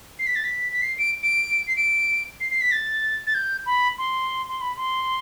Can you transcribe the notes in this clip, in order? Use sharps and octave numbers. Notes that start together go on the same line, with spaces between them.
C7
B6
A6
B6
B6
C7
D7
D7
C7
D7
C7
C7
B6
A6
A6
G6
B5
C6
C6
B5
C6